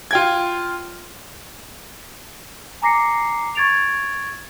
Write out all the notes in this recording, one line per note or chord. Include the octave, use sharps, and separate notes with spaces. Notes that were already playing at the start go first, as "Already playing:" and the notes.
F4 G5 G#6
G#5 A#5 D6 A#6 C7 C#7
C#6 G#6 A6 D7 F7